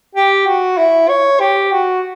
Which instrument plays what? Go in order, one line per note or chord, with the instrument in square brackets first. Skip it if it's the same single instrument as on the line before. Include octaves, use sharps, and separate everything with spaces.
[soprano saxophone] G4
F#4
E4
C#5
G4
F#4